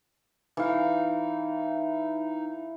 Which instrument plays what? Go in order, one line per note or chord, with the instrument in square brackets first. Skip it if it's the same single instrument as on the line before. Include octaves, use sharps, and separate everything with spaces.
[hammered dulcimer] E3 F5 [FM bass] D#4